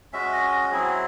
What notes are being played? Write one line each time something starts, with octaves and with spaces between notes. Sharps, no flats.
G#3 C#4 F#4 E5
D#5
D#5
F#3 C4 E4 G#4